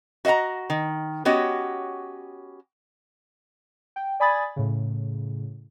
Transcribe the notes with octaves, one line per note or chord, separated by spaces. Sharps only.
F#4 D#5 E5 F#5 A#5
D#3
B3 C#4 F#4 G4 C#5 D#5
G5
D5 G#5 B5 D#6 G#6 A6
A2 C#3